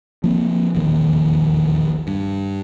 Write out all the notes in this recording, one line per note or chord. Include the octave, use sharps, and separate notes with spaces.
F3 A#3 C4
E1 A#1 D#2 D#3
G2